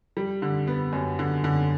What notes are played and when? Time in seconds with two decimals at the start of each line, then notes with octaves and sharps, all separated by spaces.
0.17 G3
0.42 D3
0.67 B3
0.93 F#2
1.19 D3
1.44 D3